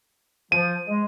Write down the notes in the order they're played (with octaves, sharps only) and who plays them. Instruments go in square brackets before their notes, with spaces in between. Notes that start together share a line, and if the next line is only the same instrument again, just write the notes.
[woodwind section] F3 [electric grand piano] D#7
[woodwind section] G#3